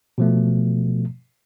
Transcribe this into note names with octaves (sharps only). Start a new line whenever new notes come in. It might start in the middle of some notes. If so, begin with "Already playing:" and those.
B2 F3 A3